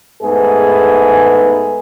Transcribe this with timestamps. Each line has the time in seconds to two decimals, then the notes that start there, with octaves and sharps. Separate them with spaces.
0.22 G#2 A3 B3 G#4 B4